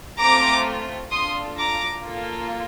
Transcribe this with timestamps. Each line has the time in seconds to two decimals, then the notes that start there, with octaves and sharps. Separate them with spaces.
0.20 A3 C4 F4 A#5 D6
1.11 D4 F4 A4 C6 D#6
1.56 A#5 D6
2.02 A#3 F4 A4